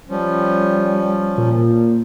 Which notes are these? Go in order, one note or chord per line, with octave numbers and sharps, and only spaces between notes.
F3 G3 C#4
A#2